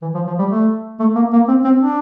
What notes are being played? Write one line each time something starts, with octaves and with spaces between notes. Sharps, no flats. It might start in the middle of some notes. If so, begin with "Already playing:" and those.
E3
F3
F3
G3
A3
A3
A#3
A#3
C4
C4
D4